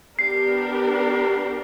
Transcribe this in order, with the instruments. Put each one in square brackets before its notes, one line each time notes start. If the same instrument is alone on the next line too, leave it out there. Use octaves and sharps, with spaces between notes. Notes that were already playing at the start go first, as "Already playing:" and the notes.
[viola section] B3 D4 G4 A#4 [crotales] C7